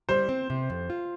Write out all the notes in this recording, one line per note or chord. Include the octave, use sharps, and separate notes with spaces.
G3 C5
C4
C3
F2
F4